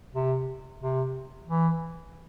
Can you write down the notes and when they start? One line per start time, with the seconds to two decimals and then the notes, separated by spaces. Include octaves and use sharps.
0.14 C3
0.81 C3
1.48 E3